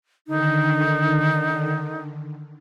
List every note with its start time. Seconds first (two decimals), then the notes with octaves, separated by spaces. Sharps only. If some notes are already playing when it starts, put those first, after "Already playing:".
0.28 D3 D#3 D#4